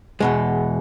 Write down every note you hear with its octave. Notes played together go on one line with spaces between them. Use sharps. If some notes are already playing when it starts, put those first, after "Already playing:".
E2 B2 G#3